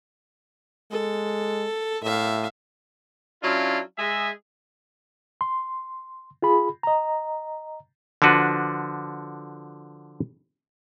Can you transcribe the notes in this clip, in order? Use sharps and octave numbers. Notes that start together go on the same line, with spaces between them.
G#3 A4
A2 E5 F5
F#3 C#4 D4 E4 F4
G#3 G#4 E5
C6
F4 G#4 B5
D#5 A#5
D3 F3 D4 F#4 B4